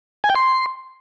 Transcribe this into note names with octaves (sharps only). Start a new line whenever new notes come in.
G#5
G5
C6